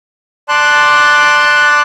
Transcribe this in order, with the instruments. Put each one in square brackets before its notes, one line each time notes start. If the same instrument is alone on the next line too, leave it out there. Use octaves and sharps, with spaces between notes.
[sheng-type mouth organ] D5 A5 C6 F#6